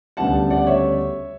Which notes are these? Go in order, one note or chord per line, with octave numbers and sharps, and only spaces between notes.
D2 C#3 G3 B3 D4 F#5 A5
D5 F#5
C#5 E5